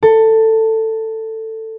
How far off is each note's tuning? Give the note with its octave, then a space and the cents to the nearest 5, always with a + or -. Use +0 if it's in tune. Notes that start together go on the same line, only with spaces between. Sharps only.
A4 +15